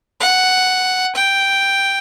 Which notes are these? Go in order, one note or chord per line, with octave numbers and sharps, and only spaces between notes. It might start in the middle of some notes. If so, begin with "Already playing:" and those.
F#5
G5